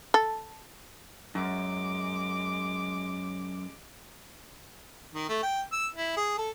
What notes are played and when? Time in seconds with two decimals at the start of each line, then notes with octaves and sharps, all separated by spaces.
0.14 A4
1.35 F#2 G#3 D6
5.15 D#3
5.29 A3
5.43 G5
5.72 E6
5.95 E4
6.17 G#4
6.38 A4